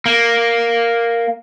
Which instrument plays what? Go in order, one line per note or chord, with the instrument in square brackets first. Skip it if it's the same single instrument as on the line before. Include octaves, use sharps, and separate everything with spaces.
[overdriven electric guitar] A#3